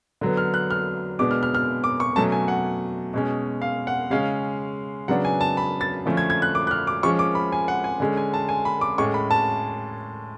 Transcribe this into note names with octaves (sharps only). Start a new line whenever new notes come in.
D3 F#3 B3
F6
F#6
F6
B2 G#3 B3 D4 D6
F6
F6
F6
D6
C#6
B2 F#3 A3 C#4 A5
G#5
F#5
B2 G#3 C#4
F5
F#5
C#3 G#3 C#4 F5
C#3 F#3 B3 D4 F#5
G#5
A5
B5
A6
D3 F3 A3 C#4
G#6
G#6
F#6
D6
F#6
F6
D6
F3 G#3 C#4 C#6
D6
B5
G#5
F#5
G#5
D3 G#3 C#4
G#5
A5
G#5
B5
D6
A2 G#3 C#4 C#6
B5
A5